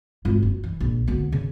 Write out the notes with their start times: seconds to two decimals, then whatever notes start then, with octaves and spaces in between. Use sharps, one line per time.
0.25 G#1 F4
0.43 F#1
0.64 E3
0.80 A#1
1.07 D2 B3
1.32 C#3